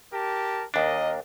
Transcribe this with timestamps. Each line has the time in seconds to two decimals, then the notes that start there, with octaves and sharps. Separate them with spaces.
0.13 G4 A#4 A5
0.74 D#2 D4 A#4 D#5